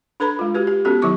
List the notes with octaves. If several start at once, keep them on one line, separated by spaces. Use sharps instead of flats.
D4 A4 B4 A#5 B5
G#3 F4
F#4 G4 B4
G4
B3 C#4 F#4 G4 A4
D#3 F#3 E4 C#6 D6